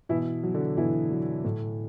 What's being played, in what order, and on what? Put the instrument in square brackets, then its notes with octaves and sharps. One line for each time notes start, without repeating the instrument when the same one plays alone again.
[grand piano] B2 E3 E4
F#3
D3 D4
B2 E3 E4
F#3
A2